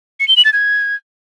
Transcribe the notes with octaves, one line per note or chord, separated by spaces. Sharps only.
C#7
G7
F#7
A6
G#6